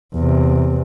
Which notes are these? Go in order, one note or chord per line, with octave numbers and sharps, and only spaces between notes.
E2 C3